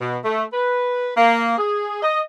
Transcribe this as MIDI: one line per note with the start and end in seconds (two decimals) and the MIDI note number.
0.01 0.17 47
0.24 0.43 57
0.53 1.10 71
1.17 1.58 58
1.58 2.01 68
2.02 2.20 75